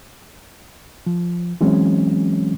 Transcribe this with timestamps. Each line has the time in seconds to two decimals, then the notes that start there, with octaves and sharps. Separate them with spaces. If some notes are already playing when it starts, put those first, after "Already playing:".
1.06 F3
1.61 E3 F#3 G#3 C4 C#4